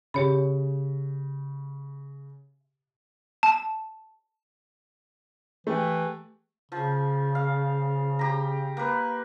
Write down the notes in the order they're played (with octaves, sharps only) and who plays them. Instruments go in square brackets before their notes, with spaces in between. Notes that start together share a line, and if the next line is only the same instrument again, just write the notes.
[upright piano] C#3 [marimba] G4 C#5 B5
[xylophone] A5
[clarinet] E3 [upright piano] A3 G4
[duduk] C#3 [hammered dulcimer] F3
[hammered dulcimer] F5
G4 A#5
A#3 B4